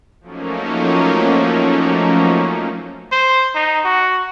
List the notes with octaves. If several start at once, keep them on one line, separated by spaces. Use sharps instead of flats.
F3 F#3 A3 A#3 C#4 D#4
C5
D#4
F#4